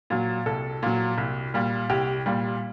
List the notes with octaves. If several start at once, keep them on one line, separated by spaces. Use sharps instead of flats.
A#2 F#3
C2 A4
A#2 F#3
C2
A#2 G3
C2 G4
A#2 G3